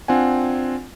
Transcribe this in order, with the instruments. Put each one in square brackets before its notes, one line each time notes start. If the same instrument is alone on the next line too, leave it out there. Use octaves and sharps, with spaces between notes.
[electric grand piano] C4 D4 F4 F#5 G#5